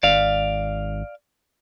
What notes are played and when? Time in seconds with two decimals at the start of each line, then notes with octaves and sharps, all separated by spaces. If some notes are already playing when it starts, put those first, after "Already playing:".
0.03 G#1 D5 F5